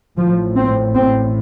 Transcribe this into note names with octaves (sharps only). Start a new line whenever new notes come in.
A1 A2 F3
C4
C4